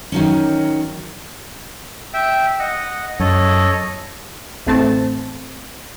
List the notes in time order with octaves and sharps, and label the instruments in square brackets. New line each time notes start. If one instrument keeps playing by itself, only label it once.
[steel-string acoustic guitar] D#3 F#3 C#4
[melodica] E5 G5
D#5 F#5
[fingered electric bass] F#2 [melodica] A4 C#5 D#5
[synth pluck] A1 E2 A3 C4 C5 A5